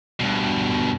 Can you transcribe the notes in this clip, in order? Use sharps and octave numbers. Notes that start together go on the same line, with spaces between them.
G2 B2